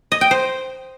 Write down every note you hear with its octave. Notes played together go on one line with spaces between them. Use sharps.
D#5
G5
C5